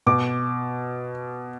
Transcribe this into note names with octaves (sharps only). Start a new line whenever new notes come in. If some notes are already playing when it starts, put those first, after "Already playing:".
B2 D6